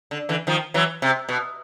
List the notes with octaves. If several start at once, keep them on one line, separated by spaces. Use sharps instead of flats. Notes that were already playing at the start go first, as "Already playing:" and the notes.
D3
D3 E3
D#3 F3
E3 F#3
C3
B2